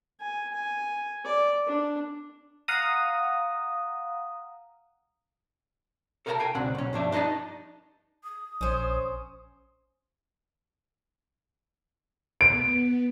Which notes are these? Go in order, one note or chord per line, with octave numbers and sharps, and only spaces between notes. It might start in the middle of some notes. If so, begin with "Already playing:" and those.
G#5
G#5
D5
D4
F5 F#5 A#5 D#6
A4 A#4 D#5 F5 A5 A#5
F5 G5 G#5
C#2 B2 C4 D4 F#5
B1 C#4
G2 F3 D4 E5
D4 D#4 F#4 D#5 A5
D#6
A#1 C#4 C5
B3 D7